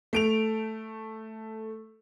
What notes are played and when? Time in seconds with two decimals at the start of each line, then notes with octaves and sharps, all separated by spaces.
0.13 A3 D7 F7